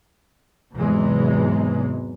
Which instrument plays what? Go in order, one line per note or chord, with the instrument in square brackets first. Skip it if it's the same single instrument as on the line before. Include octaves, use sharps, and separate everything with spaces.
[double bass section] E2 G#2 C3 E3 F#3 G#3